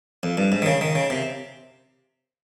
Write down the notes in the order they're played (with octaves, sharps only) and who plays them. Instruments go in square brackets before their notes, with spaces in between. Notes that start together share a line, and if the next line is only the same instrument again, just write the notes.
[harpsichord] F2
G2
G#2
D#3
C#3
D#3
C#3
C3